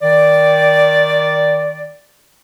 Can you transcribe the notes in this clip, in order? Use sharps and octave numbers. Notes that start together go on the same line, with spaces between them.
D#3 D5